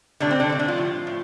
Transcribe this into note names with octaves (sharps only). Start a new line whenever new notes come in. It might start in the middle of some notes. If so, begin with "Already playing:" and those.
A2 D3 G3 D4
C4
D3 D4
A2 G3 C4
D3 D4
F3 F4
A2 G3
A2